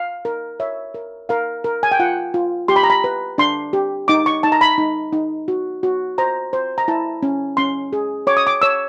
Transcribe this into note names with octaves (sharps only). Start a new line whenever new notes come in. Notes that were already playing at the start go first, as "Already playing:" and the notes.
Already playing: F5
A#4
C#5 E5
A#4
A#4 F5
A#4
G#5
G5
F4 F#5
F4
G4 C6
B5
A#5
B5
B4
D4 C6
G4
D#4 D6
C#6
D#4 A5
A#5
B5
D#4
D#4
F#4
F#4
C5 A#5
C5
A#5
E4 A5
C#4
C#4 C6
G#4
C#5 D6
D#6
D6
C#5 E6